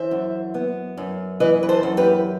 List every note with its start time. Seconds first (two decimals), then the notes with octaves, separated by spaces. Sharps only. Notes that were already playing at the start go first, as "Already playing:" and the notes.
Already playing: E3 C5 E5
0.11 F#2
0.54 B3
0.97 F#2
1.40 E3 B4 D#5
1.63 B4
1.69 A4 C5
1.83 F#2
1.97 G4 B4